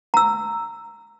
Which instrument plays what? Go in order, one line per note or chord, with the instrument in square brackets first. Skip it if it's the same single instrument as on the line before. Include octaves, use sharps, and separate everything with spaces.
[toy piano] A#5 E6